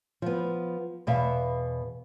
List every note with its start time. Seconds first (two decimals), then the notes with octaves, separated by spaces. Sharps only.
0.22 F3 B3
1.07 E2 B2 E5 F5